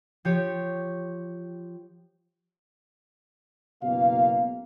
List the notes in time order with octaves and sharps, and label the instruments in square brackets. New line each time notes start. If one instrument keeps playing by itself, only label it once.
[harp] F3 G4 C#5
[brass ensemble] F#1 B2 A#3 F5